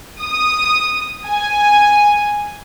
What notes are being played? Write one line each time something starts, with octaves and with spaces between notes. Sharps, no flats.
D#6
G#5